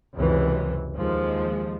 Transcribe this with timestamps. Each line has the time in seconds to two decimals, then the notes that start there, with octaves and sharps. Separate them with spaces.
0.15 C#2 F#2 C3 E3
0.95 D#2 F3 G#3